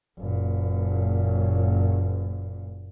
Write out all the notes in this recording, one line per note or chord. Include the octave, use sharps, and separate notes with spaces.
F#1 A#2